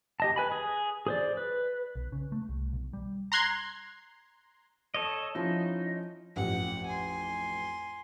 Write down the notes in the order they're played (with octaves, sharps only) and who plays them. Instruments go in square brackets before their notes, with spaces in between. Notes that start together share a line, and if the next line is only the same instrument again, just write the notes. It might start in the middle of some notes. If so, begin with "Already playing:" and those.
[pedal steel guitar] G4 D#5 A5
B4 G#5 B5
G#4
G#4 C5 D5
B4
[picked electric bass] B1
C#3
A3
C2
B1
G3
[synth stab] A#5 C6 F#6 G#6
[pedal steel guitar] A4 C#5 D#5
[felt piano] F3 C#4 E4 [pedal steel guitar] D#4
[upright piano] A1 F2 [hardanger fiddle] F#5
[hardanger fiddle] G#5 C6